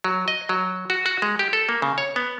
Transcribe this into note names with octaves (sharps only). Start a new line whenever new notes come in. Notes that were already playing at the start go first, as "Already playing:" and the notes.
F#3
D#5
F#3
F#4
F#4
G#3
G4
A4
A#3
C#3
C#5
B3